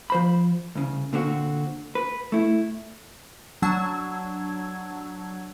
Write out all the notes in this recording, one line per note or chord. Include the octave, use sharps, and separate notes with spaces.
F3 C5 B5
C2 C#3
A#2 D3 C4 F#4
B4
A3 E4
F#3 D4 F#5 A5 E6 G#6